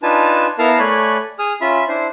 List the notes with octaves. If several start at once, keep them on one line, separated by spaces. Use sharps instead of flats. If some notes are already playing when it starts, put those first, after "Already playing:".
D4 D#4 F4 B4 G#5 A5
B3 E4 A#4 F5 A5 A#5
A3 C#5 D5 G#5 B5 F#6
G#4 G#5 D#6 F6
C#4 F4 E5 B5
D4 E4 C5